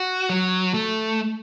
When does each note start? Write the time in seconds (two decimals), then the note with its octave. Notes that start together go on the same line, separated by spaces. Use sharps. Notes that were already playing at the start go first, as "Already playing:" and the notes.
Already playing: F#4
0.30 F#3
0.74 A3